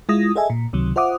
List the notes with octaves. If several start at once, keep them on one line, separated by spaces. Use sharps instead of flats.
G#3 E4 F4 D#6 A#6
G#4 A4 D#5 E5 G#5
A#2
C#2 C3 D#3 F#3
F4 C5 E5 F#5 D6 D#6